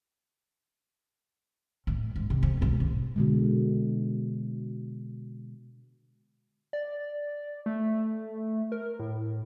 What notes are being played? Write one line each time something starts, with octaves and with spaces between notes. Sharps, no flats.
A2
G#2
C3
F2
B1 G#2
G#1
B2 D3 G#3
D5
A3
A#4
A2